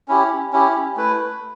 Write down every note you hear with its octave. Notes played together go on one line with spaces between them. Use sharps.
C#4 E4 G4
C#4 E4 G4
A3 E4 B4